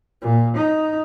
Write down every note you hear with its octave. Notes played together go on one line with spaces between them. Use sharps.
A#2
D#4